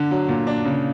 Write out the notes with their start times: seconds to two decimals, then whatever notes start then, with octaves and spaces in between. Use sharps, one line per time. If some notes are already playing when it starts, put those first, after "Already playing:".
Already playing: D3
0.11 F#3
0.28 A#2
0.47 D4
0.65 C#3